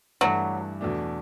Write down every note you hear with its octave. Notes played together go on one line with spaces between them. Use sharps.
G2 E3 F#3 A3 D4
E2 B2 A3 D4